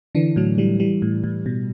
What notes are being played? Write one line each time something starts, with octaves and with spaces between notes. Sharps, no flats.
D3 E3 D4
A2 F#3
E3 G3
E3 G3
A2
A2
B2